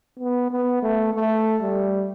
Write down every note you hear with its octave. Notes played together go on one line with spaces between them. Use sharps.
B3
B3
A3
A3
G3